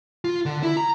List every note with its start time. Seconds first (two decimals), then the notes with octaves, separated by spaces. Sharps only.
0.24 F4
0.46 D3
0.63 E4
0.77 A#5